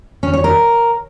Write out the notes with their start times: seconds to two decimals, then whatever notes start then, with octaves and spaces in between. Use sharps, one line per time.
0.23 C#4
0.33 C#5
0.44 A#4